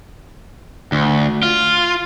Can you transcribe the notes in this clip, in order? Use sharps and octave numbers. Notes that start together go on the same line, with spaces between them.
D2
F4